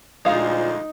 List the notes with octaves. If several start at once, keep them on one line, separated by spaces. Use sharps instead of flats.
D2 A#2 F3 G#3 D#4 F5